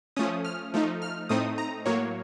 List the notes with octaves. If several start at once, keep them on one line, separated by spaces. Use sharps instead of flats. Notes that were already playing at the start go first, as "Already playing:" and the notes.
F3 A3 C#4 D#6
F6
F3 A3 D#4
F6
A2 A3 C4 D#4 D#6
A#5
A2 F#3 A#3 C#5